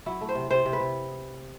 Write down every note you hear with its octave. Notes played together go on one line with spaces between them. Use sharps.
F#3 E4
A3
C5
C3
C3 C5
C3
B4
C3